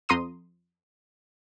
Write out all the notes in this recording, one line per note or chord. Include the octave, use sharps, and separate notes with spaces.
F2 A#5 C6 D#6 D#7